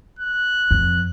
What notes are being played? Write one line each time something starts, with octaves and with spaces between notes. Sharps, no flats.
F#6
F2